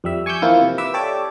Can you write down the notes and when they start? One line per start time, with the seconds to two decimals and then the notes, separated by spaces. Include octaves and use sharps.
0.04 F2 G3 E5
0.26 G#5 C#6 D6 E6 G6
0.42 E3 F3 A#3 C4 E4 F4
0.61 C3
0.78 B4 E5 D6 E6
0.94 G4 A4 C#5 D5 D6